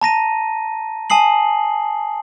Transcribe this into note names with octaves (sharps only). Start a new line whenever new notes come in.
A5 A#5 A#6 D#7
G#5 A5 D#6 C7 F#7